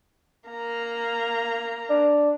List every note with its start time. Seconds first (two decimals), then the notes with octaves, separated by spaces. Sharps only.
0.49 A#3 A#5
1.90 D4